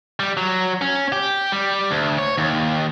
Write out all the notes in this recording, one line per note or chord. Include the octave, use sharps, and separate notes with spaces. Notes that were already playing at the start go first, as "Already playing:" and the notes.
G3
F#3
C#4
G4
G3
D2
C#5
D#2